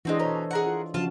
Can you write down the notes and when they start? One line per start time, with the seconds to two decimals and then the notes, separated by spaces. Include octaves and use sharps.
0.05 E3 G#3 C4 D4 F#4 D#5
0.19 B2 C#4 A4 C5 C#5 A#5
0.51 G#4 A#4 F#5
0.66 F4
0.94 C#3 F3 F4 F#4 A5